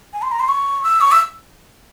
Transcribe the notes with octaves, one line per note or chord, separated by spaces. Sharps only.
G#5
C6
A#5
C6
C#6
E6
C#6
E6